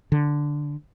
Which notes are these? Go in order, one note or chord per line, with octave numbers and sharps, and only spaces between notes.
D3